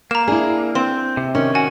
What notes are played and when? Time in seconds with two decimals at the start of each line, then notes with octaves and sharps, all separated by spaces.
0.11 A#3 A#5 E7
0.28 D4 E4 G#4
0.75 C4 C6
1.17 C3
1.35 D#3 C#4
1.55 F#4 G#5